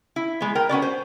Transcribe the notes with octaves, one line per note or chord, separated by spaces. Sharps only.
E4
G#3 B3
A#4 G5
B3 C#4 F#4 D5
C5